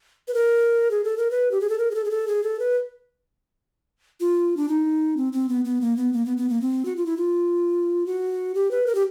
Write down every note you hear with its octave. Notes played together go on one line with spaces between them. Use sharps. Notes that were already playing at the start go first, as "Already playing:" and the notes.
B4
A#4
G#4
A4
A#4
B4
G4
G#4
A4
A#4
G#4
A4
G#4
A4
G#4
A4
B4
F4
D4
D#4
C4
C4
B3
B3
A#3
B3
A#3
B3
B3
A#3
C4
F#4
F4
E4
F4
F#4
G4
B4
A#4
G4